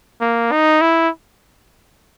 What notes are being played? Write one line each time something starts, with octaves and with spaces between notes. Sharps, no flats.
A#3
D#4
E4